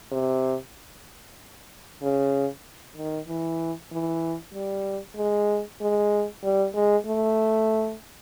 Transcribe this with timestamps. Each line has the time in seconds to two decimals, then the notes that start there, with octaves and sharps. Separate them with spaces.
0.12 C3
2.02 C#3
2.97 D#3
3.28 E3
3.92 E3
4.54 G3
5.17 G#3
5.81 G#3
6.43 G3
6.75 G#3
7.06 A3